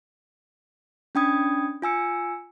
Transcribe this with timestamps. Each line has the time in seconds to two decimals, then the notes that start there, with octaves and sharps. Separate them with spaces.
1.15 C#4 D4 G5 B5 D#6 G#6
1.82 F4 G#5 E6 C#7